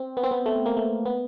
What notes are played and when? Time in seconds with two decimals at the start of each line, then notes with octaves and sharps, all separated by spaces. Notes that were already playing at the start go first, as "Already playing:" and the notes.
Already playing: C4
0.17 B3
0.23 C4
0.31 B3
0.46 A3
0.66 A#3
0.77 A3
1.06 B3